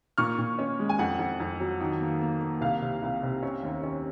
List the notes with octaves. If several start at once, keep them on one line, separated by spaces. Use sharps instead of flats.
A#2 C#6 F6
A#2
C#4
G#3
G#5
F2 F#5
F2
F2
F#3
D#3
A#3
A#3
A#3
C2 F5
C3
C2
C3
C#4
D#2
C#4